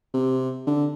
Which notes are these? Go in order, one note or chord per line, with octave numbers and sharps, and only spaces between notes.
C3
D3